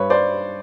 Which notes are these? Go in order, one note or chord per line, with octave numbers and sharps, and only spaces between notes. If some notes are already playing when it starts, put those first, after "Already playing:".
Already playing: G2 B4 C#5
C5 D5